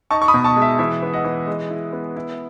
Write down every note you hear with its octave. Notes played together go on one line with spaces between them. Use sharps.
D#4 A5 C#6
C#6
B5 D#6
B2
A5 C#6
G#3
E5
E3 E5
B3
D#5 F#5
E3
G#3 D#5
E4
B3
E4